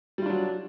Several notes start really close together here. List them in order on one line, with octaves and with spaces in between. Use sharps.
G3 F4 D4 F#3